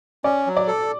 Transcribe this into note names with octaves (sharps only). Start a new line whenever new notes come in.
C#4 D5
F#3
D5
A4